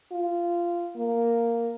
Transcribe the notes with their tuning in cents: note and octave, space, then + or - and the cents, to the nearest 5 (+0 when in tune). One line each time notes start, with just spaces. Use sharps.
F4 -15
A#3 -5